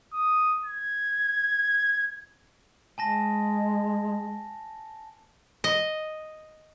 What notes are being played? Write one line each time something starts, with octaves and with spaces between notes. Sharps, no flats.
D#6
G#6
G#3 G#5 A5 A#6
D#5